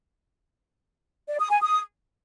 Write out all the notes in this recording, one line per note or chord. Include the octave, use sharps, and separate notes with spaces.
D5
D#6
G#5
D#6